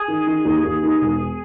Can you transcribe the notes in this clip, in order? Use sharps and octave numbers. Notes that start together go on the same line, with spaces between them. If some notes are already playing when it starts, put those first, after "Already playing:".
Already playing: G#4
D#3
D#3
D#2
D#2
D#3
E1